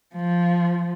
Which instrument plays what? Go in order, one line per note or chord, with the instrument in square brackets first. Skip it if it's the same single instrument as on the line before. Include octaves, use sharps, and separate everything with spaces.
[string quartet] F3